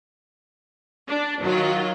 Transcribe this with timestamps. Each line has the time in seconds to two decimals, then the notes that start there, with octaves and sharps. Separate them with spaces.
1.07 D4
1.41 D#3 F#3 F4